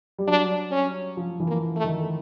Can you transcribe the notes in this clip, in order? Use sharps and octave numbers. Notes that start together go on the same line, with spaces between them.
G3
F#3 D4
C#4
F3
E3
A#3
A3
D#3